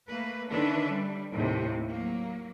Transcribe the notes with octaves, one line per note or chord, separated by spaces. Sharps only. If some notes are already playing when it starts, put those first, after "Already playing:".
A3 A#3 B4
D3 D#3 C#4 D4 B4 E5
G3
D#2 A2 C3
F#3 A#3